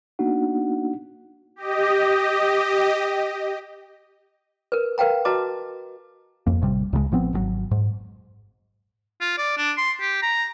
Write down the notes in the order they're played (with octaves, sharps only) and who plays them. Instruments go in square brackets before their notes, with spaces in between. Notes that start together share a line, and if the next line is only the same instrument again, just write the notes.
[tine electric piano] A#3 B3 D4 D#4 F#4 F#5
[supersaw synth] G4 D#5
[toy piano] A#4 B4
A#4 B4 F5 G5 A#5
F#4 B4 D#5 A5 A#5 D6
[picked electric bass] F2 A#3
A1 C3 G3
C#2 C#3 F3 G#3
A1 F3 B3 C4
G#1 D#3 F#3
G#2
[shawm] F4
D5
D4
C6
G4
A#5